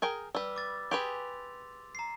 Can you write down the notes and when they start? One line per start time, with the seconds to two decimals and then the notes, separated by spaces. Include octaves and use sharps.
0.02 G#4 A#4 G5
0.35 G3 B4 E6
0.56 D6 A6
0.91 G4 G#4 B4 C6 D6 F7
1.95 A#5 C7